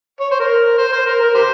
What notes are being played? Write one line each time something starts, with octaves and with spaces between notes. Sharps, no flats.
C#5
C5
A#4
C5
C5
A#4
A#4
G4 C5